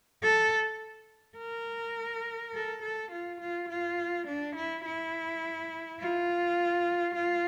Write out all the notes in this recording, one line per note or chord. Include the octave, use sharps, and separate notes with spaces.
A4
A#4
A4
A4
F4
F4
F4
D4
E4
E4
F4
F4